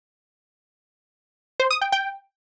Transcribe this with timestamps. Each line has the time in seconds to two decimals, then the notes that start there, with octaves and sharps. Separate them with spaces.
1.60 C5
1.71 D#6
1.81 G5
1.92 G5